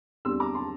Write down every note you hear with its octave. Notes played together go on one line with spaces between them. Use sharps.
E2 D3 G3 C4 C6 E6
A#5 D6
A5 C6